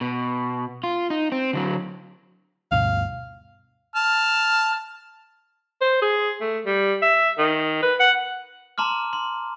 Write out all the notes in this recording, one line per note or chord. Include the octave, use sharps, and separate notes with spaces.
B2
F4
D#4
C4
D3 F#3
D2 G2 B2 F5
A5 F6
C5
G#4
A3
G3
E5
D#3
B4
F#5
A5 A#5 C6 D6 F6
C6